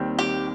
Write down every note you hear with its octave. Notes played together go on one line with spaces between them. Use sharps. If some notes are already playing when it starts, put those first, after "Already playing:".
Already playing: D#2 D#3 G3 C4
G4